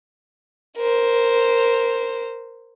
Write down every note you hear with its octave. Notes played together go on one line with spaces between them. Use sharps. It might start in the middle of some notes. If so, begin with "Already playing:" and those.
A#4 C5